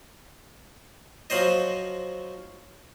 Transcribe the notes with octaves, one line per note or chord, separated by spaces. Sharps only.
F3 F#3 C5 D#5